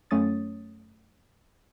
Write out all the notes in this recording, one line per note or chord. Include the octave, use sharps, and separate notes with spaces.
F#2 A3 C#4 C#5 D#6 A6